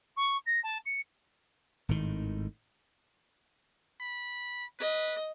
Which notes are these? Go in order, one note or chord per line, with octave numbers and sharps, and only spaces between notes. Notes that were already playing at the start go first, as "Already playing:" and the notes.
C#6
A#6
A5
C#7
G#1 A2 D#3
B5
B4 D#5